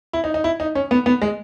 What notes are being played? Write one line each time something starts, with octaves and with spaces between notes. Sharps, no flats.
E4
D#4
D#4
E4
D#4
C#4
B3
B3
G#3